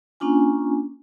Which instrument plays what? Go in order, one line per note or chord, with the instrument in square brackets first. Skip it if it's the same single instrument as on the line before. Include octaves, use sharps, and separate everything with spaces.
[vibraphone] A#3 C#4 D4 F4 G#5